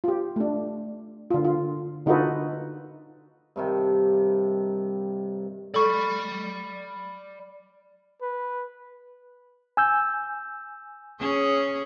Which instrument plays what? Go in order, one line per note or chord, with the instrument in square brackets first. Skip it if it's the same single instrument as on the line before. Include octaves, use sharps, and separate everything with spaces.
[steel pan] F4 G4
A3 D4
D3 F4
F4
D3 D#4 F4 F#4 A4 B4
[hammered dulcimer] G2 C3 D#3
[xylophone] A4 C#6 [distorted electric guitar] D5 B5
[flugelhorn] B4
[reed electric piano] G#5 E6 G6
[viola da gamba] C#4 G#4 C#5